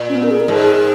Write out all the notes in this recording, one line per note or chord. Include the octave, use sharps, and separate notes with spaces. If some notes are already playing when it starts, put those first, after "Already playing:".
Already playing: A#2
C#4
B3
A#4
G#4
A#4
G#2 G#4